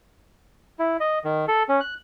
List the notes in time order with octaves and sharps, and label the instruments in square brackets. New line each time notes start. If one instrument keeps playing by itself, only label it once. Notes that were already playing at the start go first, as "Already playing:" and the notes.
[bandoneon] E4
D#5
D#3
A4
C#4
F#6